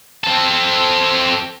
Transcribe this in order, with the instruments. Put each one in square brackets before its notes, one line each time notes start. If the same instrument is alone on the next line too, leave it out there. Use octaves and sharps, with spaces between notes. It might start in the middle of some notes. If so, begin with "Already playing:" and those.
[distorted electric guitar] C4 A4